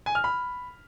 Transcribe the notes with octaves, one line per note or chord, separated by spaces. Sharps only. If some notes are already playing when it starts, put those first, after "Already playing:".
G#5
F6
B5